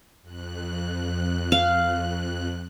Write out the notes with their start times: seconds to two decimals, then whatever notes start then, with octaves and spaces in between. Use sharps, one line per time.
0.22 F2 F#6
1.52 F5